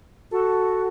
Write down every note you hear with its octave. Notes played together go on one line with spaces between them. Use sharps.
F#4 A4